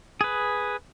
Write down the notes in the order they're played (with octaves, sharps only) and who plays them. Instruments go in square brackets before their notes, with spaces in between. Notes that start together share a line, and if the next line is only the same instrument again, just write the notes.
[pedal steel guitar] G#4 B4